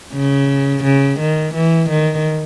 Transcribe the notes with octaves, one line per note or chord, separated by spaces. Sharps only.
C#3
C#3
D#3
E3
D#3